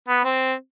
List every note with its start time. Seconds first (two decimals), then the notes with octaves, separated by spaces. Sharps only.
0.09 B3
0.25 C4